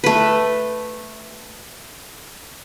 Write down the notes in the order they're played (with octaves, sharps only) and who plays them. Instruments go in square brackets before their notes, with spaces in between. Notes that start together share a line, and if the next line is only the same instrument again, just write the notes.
[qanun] A3 B4